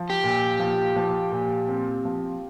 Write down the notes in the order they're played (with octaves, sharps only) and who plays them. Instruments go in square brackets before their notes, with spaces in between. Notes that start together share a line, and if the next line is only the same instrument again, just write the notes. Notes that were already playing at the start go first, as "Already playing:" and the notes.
Already playing: [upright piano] F3
[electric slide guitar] G4
[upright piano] A#2
F3
F3
A#2
C4
F3